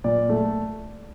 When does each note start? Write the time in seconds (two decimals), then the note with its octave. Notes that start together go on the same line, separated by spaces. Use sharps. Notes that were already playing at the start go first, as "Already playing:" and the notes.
0.04 A#2 D5
0.29 A3